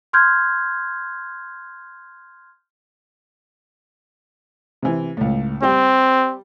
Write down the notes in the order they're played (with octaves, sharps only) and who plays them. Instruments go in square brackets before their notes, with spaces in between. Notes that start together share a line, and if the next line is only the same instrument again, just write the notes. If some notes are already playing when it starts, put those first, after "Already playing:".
[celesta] C6 F6 G6 G#6
[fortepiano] C3 E3
C#2 A2
[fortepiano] G3 G4 G5 [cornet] C4